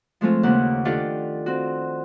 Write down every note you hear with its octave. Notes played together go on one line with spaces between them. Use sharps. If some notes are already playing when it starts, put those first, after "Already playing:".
F3 G#3 A3 C4 F4
D#2 C#3 A#3 F#5
D#3 D4 F4 G4 A4
C4 F#4